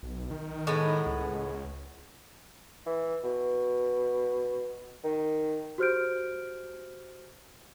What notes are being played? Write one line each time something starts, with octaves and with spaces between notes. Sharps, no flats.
B1
D#3
A2 G#3 B3
C#2
E3
B2
D#3
F#4 G4 C5 F6 G6 D7